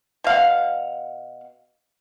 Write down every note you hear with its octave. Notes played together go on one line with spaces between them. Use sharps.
B2 F5 F#5